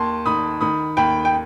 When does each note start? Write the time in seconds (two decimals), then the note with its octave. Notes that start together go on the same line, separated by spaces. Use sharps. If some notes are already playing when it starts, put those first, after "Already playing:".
Already playing: D#2 A5 C6
0.26 D#3 B5 D#6
0.61 D#3 B5 D#6
0.97 D#2 G5 B5
1.25 G5